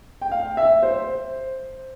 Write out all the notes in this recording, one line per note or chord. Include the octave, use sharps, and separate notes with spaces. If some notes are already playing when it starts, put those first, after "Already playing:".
G5
F5
E5
C5